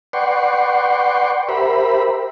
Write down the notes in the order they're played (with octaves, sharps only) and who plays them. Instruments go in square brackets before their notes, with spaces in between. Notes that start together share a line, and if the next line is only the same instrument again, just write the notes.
[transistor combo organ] B4 D5 F#5 G5 C6 C#6
G4 A#4 C5 E5 B5